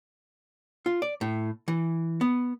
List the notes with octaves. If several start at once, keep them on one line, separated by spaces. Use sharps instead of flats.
F4
D5
A2
E3
B3